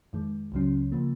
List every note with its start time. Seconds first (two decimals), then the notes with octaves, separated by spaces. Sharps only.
0.13 F2 D#3 G#3
0.52 C#2 C#3 F#3 C#4
0.92 C#3 F3 A#3